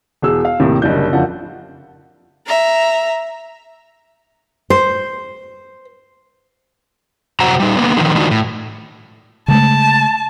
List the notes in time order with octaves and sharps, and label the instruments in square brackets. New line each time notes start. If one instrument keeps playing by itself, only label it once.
[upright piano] E1 G#4 E6
F5
D#2 A2 C3 D#3
F#1 D3 G3 D#5 G6
F#1 F2 D3 F4 F#5 A5
[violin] E5 A#5
[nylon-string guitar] C5
[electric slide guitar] F#2 C3 C4 F#4 A#5
G3 D#4
D3 A#3 B3
D3 D#3 F3
D#3 G#3 D4 D#4 F4 F#4
A2
[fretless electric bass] C#3 G#3 A3 [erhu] A5